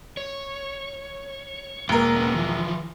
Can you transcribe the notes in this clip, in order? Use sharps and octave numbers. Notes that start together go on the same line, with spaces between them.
C#5
E1 A#3 A#4
A#3 B3 C#4
E3 F3